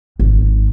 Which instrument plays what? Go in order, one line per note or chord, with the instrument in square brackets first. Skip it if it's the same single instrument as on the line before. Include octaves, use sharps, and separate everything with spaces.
[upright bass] G#1